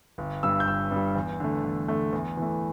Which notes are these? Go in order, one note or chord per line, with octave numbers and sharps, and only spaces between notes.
G1
G2 G3 E6
G6
G1 E6
G2 G3
E2
D3 A3
E2
D3 A3
E2
E3 A3